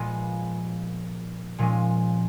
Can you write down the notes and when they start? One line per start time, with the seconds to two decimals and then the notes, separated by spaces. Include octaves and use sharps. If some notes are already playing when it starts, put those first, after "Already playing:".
Already playing: A#2 F3 G#3 B3
1.59 A#2 F3 G#3 C#4